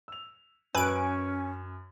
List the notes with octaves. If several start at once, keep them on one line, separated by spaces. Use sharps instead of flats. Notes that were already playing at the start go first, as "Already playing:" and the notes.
E6 F7
F#2 C#4 B4 G#5 E6 D7